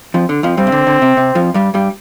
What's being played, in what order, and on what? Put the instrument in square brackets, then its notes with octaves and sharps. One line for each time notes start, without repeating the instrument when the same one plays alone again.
[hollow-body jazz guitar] F2 F3
D3
F2 F3
[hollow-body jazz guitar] G2 G3 [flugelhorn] C4
[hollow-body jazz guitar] C3
D3
D3
C3
C3
F2 F3
G2 G3
G2 G3